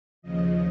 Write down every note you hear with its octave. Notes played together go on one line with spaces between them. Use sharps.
D#2 C#3 F3 D#5